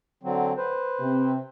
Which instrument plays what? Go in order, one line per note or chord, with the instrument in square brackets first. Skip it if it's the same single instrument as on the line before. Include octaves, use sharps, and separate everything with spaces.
[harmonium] D3 F#3 C4
B4 C5
[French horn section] C3 C4